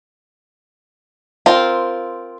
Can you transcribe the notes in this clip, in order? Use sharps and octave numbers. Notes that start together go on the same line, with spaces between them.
C4 F4 A#4